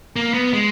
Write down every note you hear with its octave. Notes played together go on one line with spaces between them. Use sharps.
A#3
B3
G#3